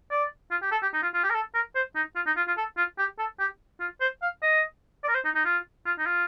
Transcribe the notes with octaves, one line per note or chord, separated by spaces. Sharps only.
D5
F4
G4
A4
G4
D#4
F4
F4
G4
A#4
A4
A#4
C5
D#4
F4
D#4
F4
F4
A4
F4
G4
A4
G4
F4
C5
F5
D#5
D5
A#4
C5
D#4
D#4
F4
F4
D#4
F4